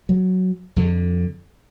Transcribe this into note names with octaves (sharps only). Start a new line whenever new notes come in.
F#3
F2 D3